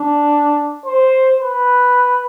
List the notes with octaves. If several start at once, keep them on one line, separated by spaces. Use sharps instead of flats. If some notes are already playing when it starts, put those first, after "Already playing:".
Already playing: D4
C5
B4